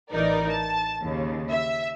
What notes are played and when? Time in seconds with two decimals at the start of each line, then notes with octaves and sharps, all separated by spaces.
0.10 A1 E3 D#4 A#4 D5
0.48 A5
1.03 D#2 C#3
1.50 E5